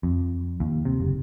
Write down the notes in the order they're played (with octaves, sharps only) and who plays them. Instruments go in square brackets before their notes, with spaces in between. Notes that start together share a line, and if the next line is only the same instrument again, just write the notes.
[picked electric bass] F2
D#2
C3
F#1